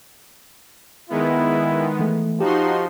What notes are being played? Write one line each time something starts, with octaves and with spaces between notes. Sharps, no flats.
D#3 G#3 B3 E4
E3 A3
F3 D#4 F#4 G4 C6